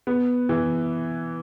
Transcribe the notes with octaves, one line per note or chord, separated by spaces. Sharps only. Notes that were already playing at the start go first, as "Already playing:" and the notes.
B3
E3